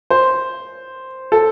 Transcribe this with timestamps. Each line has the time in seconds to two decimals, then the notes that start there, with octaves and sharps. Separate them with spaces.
0.10 C5
1.32 A4